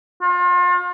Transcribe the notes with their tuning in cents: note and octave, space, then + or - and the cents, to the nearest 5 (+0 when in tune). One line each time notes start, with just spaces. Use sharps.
F4 +35